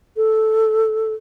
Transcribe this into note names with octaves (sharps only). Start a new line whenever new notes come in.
A4